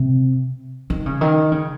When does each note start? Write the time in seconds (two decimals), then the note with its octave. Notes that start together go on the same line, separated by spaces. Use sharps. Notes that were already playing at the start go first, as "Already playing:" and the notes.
Already playing: C3
0.90 D#3
1.06 C#3
1.21 D#3
1.52 C#3